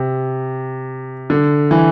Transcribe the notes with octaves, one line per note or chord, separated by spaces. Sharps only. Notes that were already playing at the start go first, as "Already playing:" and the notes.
Already playing: C3
D3
E3